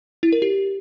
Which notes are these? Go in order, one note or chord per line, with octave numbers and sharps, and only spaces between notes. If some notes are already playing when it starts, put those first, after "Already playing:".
E4
A#4
G4